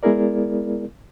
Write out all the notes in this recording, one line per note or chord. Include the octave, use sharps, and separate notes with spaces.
G#3 B3 E4 G#4 A#4 D5